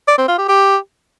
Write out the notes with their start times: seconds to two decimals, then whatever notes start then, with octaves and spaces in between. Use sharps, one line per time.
0.08 D5
0.18 C4
0.28 F4
0.38 G4
0.49 G4